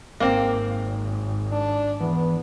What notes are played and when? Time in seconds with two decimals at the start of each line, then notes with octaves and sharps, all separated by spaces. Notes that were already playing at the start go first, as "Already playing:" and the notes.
0.20 G#1 A#3 C4
1.52 D4
2.00 E2 B3